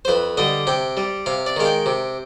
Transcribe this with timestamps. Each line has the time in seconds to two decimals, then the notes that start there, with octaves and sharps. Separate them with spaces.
0.05 C5
0.08 F2 B4
0.37 D3 G3 D#5
0.67 C3 G5
0.97 G3
1.26 C3 F5
1.46 D5
1.56 D#3 G#3 F5
1.65 G5
1.86 C3